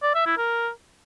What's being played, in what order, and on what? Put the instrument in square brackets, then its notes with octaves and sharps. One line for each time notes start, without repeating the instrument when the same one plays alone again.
[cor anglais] D5
E5
E4
A#4